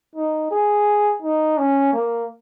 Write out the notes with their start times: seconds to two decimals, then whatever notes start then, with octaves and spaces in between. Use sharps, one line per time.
0.15 D#4
0.51 G#4
1.22 D#4
1.58 C#4
1.93 A#3